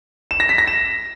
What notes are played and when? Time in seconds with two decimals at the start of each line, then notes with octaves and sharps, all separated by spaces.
0.31 E7
0.40 A#6
0.49 B6
0.58 A#6
0.67 E7